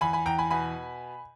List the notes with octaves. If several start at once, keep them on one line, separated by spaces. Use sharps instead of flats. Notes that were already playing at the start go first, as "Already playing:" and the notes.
E2 G#5 B5
G#5 B5
E2 G5 A#5
G#5 B5
B2 G#5 B5